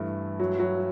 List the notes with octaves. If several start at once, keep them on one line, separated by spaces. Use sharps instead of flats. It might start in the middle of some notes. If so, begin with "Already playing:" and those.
Already playing: G2 E3 A3 E4
F#3
F#3